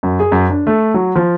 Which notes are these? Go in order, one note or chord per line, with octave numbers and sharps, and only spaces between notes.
F#2
G#4
F#2
D4
A3
F#3
F3